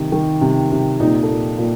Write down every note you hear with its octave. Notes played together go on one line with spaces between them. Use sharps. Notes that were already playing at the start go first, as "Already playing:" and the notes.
Already playing: C3 D#3
D#3
C3
C3
A#2 D#4
A4
A#2
A#2